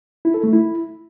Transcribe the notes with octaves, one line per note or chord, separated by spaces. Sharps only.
E4
A4
A3
E4